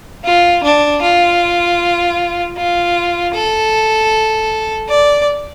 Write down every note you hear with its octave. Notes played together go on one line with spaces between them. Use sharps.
F4
D4
F4
F4
A4
D5